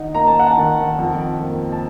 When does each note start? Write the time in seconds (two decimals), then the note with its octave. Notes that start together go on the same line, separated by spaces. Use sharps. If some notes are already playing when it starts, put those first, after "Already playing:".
Already playing: D#3 D#4 F#5
0.14 A#3 A#5
0.27 A5
0.39 F#5
0.52 A5
0.57 D#3
0.99 F2
1.41 A#3
1.72 A5